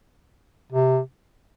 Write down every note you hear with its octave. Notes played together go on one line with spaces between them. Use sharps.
C3